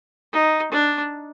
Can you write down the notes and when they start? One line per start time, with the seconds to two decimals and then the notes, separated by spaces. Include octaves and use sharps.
0.32 D#4
0.72 D4